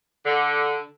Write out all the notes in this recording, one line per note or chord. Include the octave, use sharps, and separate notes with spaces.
D3